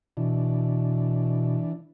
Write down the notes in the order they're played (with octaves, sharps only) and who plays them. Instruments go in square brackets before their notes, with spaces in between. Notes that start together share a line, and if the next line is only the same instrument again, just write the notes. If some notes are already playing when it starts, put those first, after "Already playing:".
[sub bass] B2 [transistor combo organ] E3 D4